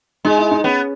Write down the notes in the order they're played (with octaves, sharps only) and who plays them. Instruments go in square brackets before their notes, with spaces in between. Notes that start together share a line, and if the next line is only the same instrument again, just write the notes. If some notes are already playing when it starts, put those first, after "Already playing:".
[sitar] G#3 [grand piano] D#4
[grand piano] E4
D#4
[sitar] B3 [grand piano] C#4